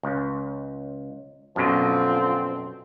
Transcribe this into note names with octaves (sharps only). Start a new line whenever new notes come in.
C#2
F#2 B2 D3 F3 C4